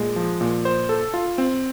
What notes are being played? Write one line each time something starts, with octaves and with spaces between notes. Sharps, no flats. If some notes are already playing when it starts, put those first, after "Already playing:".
Already playing: A#2 G#3
F3
A#2
C5
A4
F4
C4